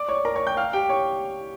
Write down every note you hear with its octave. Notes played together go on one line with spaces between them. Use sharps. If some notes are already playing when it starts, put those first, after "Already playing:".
Already playing: D5 D6
C#5 C#6
A#4 A#5
C#5 C#6
G5 G6
F5 F6
G4 G5
C#5 C#6